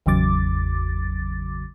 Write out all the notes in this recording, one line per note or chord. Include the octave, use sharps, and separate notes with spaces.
G#1 E2 C#3 F#3 D6 A6